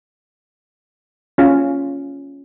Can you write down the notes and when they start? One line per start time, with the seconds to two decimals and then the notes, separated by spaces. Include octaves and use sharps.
1.38 C#4 F4